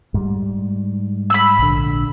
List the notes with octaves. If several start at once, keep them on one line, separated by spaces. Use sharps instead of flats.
G#2 G3
B5 E6
A#1 D3